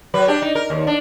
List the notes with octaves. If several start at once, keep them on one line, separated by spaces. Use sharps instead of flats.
F#3 B4
D4 G4
D#4
A#4
D#2
D4